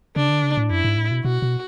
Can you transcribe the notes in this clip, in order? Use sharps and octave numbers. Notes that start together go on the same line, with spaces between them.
C#3 D4
D3
C#3
A2
F#2 E4
G#2
A2
B2
B2 F#4
B2